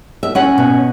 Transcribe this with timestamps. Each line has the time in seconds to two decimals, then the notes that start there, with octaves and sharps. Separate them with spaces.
0.23 E5
0.35 C#4 F#5
0.58 B2